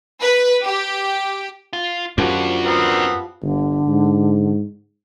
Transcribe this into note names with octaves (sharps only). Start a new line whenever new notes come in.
B4
G4
F4
F#2 F3 G3 D4 F#4
B3 C4 A#4
G1 D3
G#2